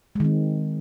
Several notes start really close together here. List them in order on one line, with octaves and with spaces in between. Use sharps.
G#3 D#3 C4